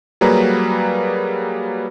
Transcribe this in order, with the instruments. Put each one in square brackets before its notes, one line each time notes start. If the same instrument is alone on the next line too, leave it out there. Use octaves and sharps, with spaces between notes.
[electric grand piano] F#3 G3 A#3 G#4 B4 A#5